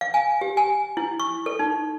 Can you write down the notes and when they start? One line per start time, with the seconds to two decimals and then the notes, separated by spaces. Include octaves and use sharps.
0.01 F5
0.14 G#5
0.41 G4
0.57 G#5
0.97 E4
1.20 C#6
1.46 A4
1.59 D#4